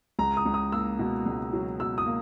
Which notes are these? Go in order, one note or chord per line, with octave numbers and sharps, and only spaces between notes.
C#2 A#5
D#6
C#2
D#6
A#3 E6
B2
C#2
F#3
B2 E6
D#6
A#3